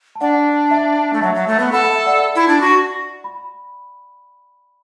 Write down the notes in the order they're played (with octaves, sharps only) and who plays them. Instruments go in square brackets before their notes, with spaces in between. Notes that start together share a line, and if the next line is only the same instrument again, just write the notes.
[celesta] A5
[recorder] D4 [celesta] D5 F#5
[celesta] E5 A5
[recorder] A3
[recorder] F#3 [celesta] E5 A5
[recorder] F#3
A3
B3
[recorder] A4 [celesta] F#5 B5
[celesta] E5 A5
D5 F#5
[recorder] E4
D4
F#4
[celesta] B5